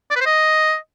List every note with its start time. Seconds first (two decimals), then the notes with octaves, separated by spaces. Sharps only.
0.10 D5
0.16 B4
0.21 C5
0.26 D#5